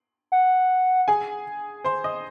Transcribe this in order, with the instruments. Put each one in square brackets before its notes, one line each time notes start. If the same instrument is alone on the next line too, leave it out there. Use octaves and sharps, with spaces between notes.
[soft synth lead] F#5
[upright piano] G#4 G#5
C5 C6
D#5 D#6